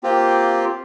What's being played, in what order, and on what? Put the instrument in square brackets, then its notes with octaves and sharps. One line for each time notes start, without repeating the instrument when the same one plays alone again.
[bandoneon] A#3 C4 F4 G4